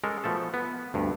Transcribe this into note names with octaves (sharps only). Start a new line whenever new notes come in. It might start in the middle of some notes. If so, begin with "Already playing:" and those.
G#3 C#4 A4 A#4
B2 F3 A3 A4
B3
D2 G2